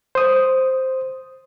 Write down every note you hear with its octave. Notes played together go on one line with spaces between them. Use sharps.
C5 D#6